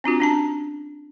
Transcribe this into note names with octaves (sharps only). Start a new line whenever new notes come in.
C4 D4 F4 F#4
C#4 D4 A5